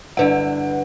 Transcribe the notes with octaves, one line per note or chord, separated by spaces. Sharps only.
G2 D3 E4 B4 F#5